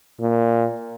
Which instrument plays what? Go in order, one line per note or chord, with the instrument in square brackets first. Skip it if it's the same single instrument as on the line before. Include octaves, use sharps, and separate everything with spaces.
[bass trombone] A#2